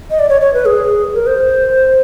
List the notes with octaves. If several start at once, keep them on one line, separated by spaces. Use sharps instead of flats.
D#5
D5
C#5
C#5
B4
G#4
A#4
C5